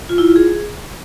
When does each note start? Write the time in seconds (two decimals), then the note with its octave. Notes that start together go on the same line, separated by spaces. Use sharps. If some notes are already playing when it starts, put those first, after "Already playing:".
0.09 F4
0.18 E4
0.27 F4
0.36 G#4